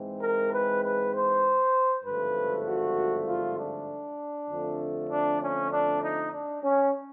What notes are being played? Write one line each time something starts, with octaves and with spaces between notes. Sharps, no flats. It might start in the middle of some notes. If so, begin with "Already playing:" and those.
Already playing: G#2 E3 G#3 C4
A#4
B4
B4
C5
G#1 G2 D3 F3 A3 B4
F#4
F4
D4
F2 D3 F3 A3
D4
C#4
D4
D#4
D4
C#4